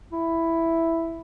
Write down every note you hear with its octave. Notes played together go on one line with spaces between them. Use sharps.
E4